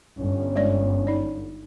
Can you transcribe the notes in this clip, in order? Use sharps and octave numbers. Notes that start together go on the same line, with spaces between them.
G1 C#4
G#3 C#5 D5
D#4 D5